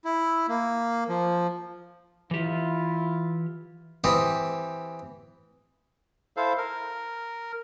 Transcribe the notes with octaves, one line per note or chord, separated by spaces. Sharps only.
E4
A#3
F3
E3 E4 F4 G4
E3 C4 G4 D#5
E4 A4 C5 F5
A#4